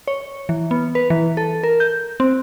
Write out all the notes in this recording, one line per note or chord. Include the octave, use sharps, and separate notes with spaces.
C#5
E3
B3
B4
E3
A4
A#4
G6
C4